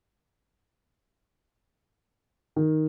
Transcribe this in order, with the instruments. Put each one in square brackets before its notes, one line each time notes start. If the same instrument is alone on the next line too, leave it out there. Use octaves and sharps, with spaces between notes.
[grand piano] D#3